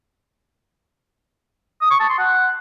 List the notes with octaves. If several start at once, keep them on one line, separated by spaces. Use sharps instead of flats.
D#6
C#6
A5
C6
F#5